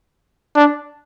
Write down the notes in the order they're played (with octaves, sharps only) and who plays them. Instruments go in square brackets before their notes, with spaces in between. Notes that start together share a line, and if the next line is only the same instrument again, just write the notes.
[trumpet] D4